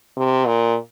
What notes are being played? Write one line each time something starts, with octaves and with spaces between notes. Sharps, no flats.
C3
A#2